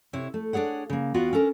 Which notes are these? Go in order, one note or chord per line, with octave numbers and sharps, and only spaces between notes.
C3 E4 C#5
A3
D4 D#4 G#4 C#5 F#5
C#3 A#3
E2 B3 F4 F#4 F5 G5
C#4 D4 A4 A#4